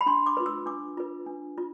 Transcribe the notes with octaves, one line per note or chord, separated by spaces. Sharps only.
B5
D4 C6
D6
F4 B4
E6
D4 D6
F4 B4
D4
F4